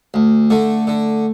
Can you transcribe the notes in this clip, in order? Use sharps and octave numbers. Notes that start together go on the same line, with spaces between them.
D2
D3 A3
D3